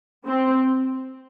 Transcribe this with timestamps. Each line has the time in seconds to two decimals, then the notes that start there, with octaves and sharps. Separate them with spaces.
0.25 C4